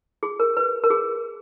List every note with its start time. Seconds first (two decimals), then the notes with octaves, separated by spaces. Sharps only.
0.23 G#4
0.40 A#4
0.57 B4
0.84 A#4
0.90 G#4